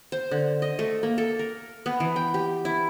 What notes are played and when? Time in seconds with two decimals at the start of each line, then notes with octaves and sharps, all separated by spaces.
0.12 C5
0.31 D3
0.62 D#5
0.79 A3
1.03 A#3
1.18 A4
1.39 A#4
1.86 B3
2.00 E3
2.16 G5
2.34 G4
2.65 E4